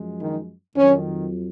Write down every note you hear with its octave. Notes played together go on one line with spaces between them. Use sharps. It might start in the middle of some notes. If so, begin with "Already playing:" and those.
Already playing: F#2 F3 G#3
D#3 D#4
F2 D#3 F#3 C#4